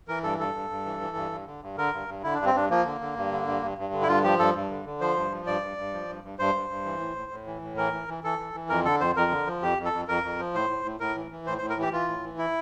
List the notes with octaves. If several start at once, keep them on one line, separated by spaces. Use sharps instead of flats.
E3 A#4
G2 A4
G2 A4
G2
G2
E3
E3
G2
G2
D3
G2
D3 A#4
G2
G2
D3 E4
G2 D4
C4
G2 D4
F3 A#3
D3
D3
G2
D3
G2
G2
G2
D3
E4
G2 F4
F3 G4
G2 A4
G2
D3
D3
F3 C5
G2
F3
G2 D5
G2
G2
F3
G2
G2
G2 C5
G2
G2
E3
A2
A2
A2
E3
A2
E3 A#4
E3
E3
E3 A4
E3
E3
F2 A#4
D3 A4
F2 C5
F2 A#4
D3
F3
F2 G4
F2
A4
F2
F2 A#4
F2
F3
A2 C5
A2
A2
A2 A#4
E3
E3
A2 C5
C5
A2
A#4
E3 G4
E3 F4
A2
E3
E4